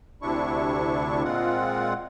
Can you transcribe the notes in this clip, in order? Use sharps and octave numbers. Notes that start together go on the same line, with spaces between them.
D2 C3 D4 E4 C#6
A#2 G#3 C4 F4 F#5